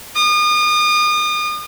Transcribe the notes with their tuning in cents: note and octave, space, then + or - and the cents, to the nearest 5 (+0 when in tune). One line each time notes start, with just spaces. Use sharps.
D#6 -40